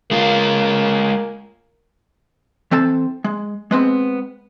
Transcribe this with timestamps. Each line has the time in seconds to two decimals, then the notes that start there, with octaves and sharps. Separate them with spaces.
0.11 G#3 A#3 F4
2.71 E3 C4 A4 A5
3.24 G#3
3.71 G#3 B3 C4